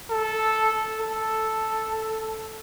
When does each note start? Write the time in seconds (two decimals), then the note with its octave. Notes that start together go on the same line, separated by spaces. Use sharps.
0.10 A4
1.01 A4